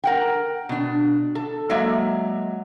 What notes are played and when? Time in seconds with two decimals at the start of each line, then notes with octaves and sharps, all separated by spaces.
0.04 A#4 F#5 G5
0.69 B2 D4
1.35 A4
1.70 F#3 G#3 A#3 D5 E5